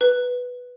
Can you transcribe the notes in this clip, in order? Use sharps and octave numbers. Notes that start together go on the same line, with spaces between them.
B4